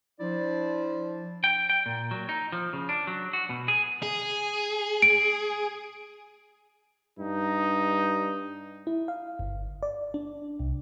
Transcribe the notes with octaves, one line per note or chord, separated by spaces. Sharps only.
F3 D4 E4 C5 D5
G5
G5
A#2
F#3
D#4
F3
C#3
D4
F#3
F#4
B2
G#4
G#4
D7
G2 D#4
E4
F5
G1
D5
D4
C2